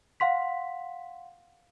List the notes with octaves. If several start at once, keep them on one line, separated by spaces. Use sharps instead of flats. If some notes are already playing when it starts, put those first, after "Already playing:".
F5 F#5 C6 B6